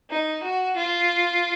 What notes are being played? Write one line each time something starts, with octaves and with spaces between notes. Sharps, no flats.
D#4
F#4
F4